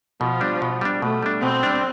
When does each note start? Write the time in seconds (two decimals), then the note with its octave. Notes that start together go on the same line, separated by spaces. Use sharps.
0.21 B2 F3
0.41 G3 D4
0.62 B2
0.81 G3 D4
1.01 B2 A3
1.23 G3 D4
1.42 B2 C4
1.63 G3 D4